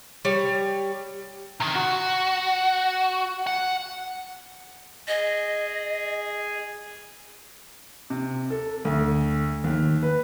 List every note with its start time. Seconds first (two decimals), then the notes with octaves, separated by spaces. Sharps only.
0.25 G3 C#5
1.60 C3 D#3
1.75 F#4
3.47 F#5
5.08 G#4 D#5
8.10 C3
8.50 A4
8.85 D2
9.64 D#2
10.02 B4